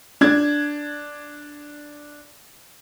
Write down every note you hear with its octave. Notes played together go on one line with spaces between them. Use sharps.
D4 G#6